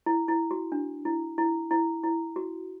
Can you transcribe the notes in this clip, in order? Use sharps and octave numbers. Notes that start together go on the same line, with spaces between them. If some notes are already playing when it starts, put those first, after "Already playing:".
E4
E4
F#4
D4
E4
E4
E4
E4
F#4